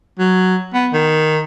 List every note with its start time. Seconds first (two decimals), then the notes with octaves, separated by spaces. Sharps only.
0.19 F#3
0.74 B3
0.93 D#3